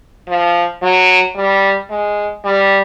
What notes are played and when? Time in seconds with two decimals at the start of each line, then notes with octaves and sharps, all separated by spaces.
0.28 F3
0.83 F#3
1.36 G3
1.90 G#3
2.45 G3